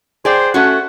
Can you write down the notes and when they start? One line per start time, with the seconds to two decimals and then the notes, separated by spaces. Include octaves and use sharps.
0.25 G#4 C5 D5 G5
0.54 A3 C#4 F#4 F#5